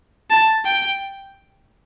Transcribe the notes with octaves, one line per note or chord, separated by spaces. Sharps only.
A5
G5